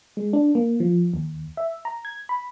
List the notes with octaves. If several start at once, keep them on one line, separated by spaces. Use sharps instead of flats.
G#3
D4
A#3
F3
D#2
E5
A#5
G#6
B5